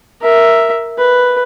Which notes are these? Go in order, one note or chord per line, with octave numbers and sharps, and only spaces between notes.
A#4 E5
B4